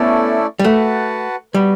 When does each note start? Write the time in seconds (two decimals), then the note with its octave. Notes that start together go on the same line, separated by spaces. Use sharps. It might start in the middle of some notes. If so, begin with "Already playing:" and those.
Already playing: A3 B3 C#4 E4 A4 D5
0.59 G3
0.64 A3 F#4 B4 F#5 A5
1.53 G3 B3 F#4 B4